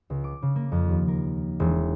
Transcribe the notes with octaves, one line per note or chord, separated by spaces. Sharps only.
C#2
D6
C#3
A#3
F2
D#2
A#4
E1